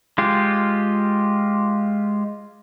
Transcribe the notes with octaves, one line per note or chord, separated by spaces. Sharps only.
G#3 F4 G4